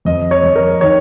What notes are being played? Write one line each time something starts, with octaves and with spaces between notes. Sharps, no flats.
F2 D#5
C#5
F2
A#4
D#3 C#5